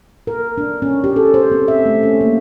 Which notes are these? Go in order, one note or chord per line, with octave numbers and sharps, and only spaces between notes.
A#4
D4
C#4
G4
A4
C5
C4
E5
A3
C#4
A#3